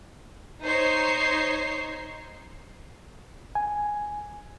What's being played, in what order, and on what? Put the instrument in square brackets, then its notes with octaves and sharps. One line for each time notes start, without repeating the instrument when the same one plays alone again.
[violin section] D#4 C5 C#5 C7
[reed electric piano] G#5